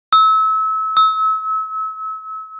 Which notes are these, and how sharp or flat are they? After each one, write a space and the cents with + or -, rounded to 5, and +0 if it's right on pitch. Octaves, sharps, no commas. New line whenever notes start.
E6 -30
E6 -35